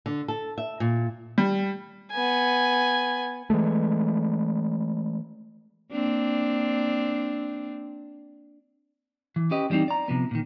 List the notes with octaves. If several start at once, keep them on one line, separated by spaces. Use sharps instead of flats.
D3
A4
E5
A#2
G3
B3 G#5
E3 F3 G#3 A3
A#3 C4 D4
E3
C#4 G4 B4 D#5
E3 G3 A3 C4 D#4
D5 A#5
C3 F3 B3
A#2 D#3